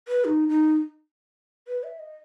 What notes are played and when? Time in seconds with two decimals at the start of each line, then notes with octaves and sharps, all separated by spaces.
0.08 B4
0.25 D#4
0.49 D#4
1.68 B4
1.84 E5
1.99 D#5